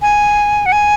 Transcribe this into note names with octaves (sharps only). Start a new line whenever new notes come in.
G#5
F#5
G#5